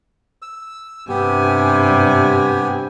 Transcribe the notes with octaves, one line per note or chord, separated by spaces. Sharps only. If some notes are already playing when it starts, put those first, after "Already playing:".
E6
G2 C3 B3 G4 G#5